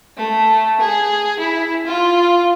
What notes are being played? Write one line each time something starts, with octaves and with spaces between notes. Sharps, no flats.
A3
G#4
E4
F4